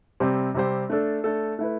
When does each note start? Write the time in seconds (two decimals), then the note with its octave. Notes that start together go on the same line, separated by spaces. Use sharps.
0.20 C3 G3 C4 G4 C5
0.54 C3 G3 C4 G4 C5
0.90 A3 D4 A4
1.24 A3 D4 A4
1.59 A3 E4 B4